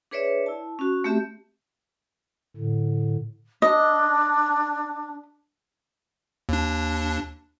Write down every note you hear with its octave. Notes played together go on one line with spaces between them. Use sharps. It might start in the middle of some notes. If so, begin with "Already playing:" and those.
D4 G#4 B4 C#5 D5 E5
E4 A5
C#4 F#4
A3 C4 G4 E5
A2 D3
D4 D#5
D#2 D4